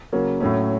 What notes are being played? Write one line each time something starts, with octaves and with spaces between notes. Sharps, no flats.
C#3 F#3 A#3 C#4
A2 F#3 A3 C#4